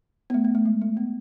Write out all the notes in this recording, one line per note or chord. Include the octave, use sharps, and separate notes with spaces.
B3
A3
B3
A3
G#3
A3
B3